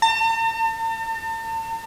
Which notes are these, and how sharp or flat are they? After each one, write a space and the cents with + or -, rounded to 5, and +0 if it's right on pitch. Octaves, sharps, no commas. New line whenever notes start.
A5 +45